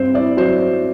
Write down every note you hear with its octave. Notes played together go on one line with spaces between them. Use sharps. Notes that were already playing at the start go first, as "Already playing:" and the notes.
Already playing: G2 C4 C5
E4 D5
F#3 C5